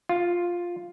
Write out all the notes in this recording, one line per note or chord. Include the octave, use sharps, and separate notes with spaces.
F4